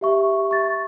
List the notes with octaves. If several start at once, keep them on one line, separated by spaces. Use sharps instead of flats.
G4 E5 C#6
C#6 A6